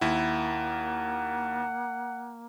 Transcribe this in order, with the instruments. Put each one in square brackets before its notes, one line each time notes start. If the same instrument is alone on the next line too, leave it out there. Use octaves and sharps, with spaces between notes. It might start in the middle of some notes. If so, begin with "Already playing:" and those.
[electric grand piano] D#2 E4 [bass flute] A#3 [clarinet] F#5